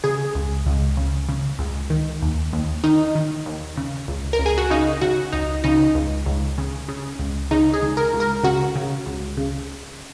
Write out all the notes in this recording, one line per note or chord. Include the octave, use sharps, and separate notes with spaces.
C#3 G#4
C#2
C#2
C#3
C#3
C#2
D#3
D#2
D#2
D#3 D#4
D#3
D#2
C#3
C#2
A#4
C#2
G#4
F#4
C#3 D#4
C#3 F#4
C#2 D#4
C#3 D#4
C#2
C#2
C#3
C#3
C#2
C#3 D#4
G#4
C#2
A#4
C#2
A#4
C#3 F#4
C#3
C#2
C#3